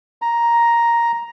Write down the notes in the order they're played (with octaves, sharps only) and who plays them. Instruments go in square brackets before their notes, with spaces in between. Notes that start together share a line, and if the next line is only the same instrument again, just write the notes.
[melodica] A#5